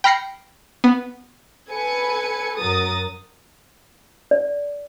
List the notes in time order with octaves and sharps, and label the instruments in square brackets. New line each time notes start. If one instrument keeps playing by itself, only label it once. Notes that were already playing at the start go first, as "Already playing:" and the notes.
[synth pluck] G5 B5 F6 A#6 C7 C#7
B3
[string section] A4 B4 G#5 C#7
F#2 F#3 A#4 D#6 A6
[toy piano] D5